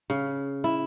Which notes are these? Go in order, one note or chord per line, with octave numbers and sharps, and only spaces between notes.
C#3
E4